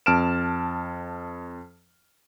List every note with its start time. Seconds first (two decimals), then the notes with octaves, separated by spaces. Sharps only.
0.06 F2 A5 F6 D7 E7